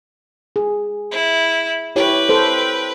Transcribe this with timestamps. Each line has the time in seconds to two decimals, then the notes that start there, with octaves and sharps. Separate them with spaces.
0.56 G#4
1.11 E4
1.96 E4 G4 B4 C#5 G5
2.29 A4 C5